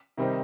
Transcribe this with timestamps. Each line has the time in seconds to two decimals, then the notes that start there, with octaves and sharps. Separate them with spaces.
0.17 C3 D#3 G3 C4 D#4